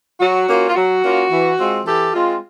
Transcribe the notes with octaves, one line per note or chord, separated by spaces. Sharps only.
F#3 F#4
A#3 C#4 F4
F4
F#3 F#4
A#3 C#4 F4
E3
G#3 C4 F4
E3 G4 A4
G#3 C4 F4